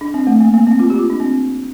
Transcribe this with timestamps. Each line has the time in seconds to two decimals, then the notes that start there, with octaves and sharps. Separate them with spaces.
0.01 D4
0.14 C4
0.27 A3
0.40 A#3
0.54 A#3
0.67 C4
0.80 F4
0.90 G4
0.99 F4
1.10 D4
1.20 C4